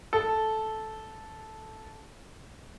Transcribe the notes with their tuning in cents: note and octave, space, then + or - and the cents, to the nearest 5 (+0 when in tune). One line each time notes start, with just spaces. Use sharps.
A4 -10